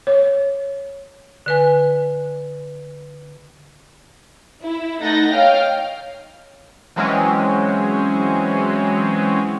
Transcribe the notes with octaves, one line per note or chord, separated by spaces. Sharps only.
C#5
D3 B4 G#5
E4
A3 D#4 F#5 G6 A6 A#6
C#5 D#5 F5 G5 F6
E3 F#3 G#3 C4 C#4